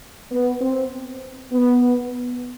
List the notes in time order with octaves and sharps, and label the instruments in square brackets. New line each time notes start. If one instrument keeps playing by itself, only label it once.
[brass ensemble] B3
C4
B3